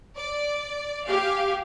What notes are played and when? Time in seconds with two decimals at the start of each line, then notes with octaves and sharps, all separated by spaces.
0.17 D5
1.07 G4 F5 G#5